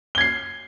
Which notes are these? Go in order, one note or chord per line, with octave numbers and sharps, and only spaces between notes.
G#6 C7 G7